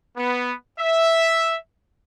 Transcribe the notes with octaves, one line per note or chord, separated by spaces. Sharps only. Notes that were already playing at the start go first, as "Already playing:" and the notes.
B3
E5